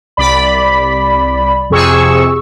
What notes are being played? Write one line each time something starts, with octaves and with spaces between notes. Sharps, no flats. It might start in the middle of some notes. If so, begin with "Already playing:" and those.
C2 D5 B5
F2 C3 G#4 C#6 E6